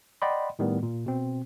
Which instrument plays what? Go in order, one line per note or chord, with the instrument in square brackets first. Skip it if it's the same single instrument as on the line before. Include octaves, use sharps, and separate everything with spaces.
[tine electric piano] D5 D#5 F#5 G5 B5 C6
A2 D#3 G3 B3
A#2
B2 C4